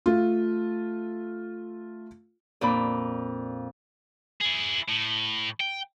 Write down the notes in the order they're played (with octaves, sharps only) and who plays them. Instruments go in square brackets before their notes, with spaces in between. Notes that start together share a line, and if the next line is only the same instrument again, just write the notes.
[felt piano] A3 F4
[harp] F2 A#2 D4 B5
[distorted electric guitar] E4 G#4
A2
G5